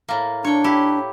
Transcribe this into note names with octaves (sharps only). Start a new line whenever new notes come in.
A2 A#3
D4 C#5 G5
E4 G4